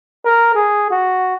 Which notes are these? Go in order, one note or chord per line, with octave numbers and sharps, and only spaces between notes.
A#4
G#4
F#4